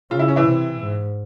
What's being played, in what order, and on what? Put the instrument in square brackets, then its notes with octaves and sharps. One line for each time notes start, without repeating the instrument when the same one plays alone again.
[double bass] C#3 [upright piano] F4
[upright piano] E4
C#4
E3 E4
[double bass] C3
G#2